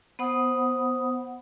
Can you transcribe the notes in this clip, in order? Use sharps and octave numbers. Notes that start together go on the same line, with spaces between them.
B3 C5 F#5 B5 D#6